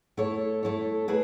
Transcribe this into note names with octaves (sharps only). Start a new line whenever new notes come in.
A3 E4 A4 C#5
A3 E4 A4 C#5
A3 E4 G#4 B4